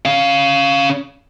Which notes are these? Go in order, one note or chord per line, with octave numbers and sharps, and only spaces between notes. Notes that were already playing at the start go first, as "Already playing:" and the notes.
C#4 F5